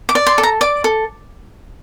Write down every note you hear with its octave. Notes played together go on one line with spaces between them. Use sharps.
D6
D5
C6
A4
A#5
D5 D6
A4